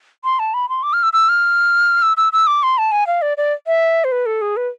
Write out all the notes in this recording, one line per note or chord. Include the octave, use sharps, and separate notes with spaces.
C6
A5
B5
C6
D6
F6
E6
E6
F6
E6
E6
E6
D6
C6
A5
G#5
F5
D5
D5
E5
C5
B4
A4
G#4
B4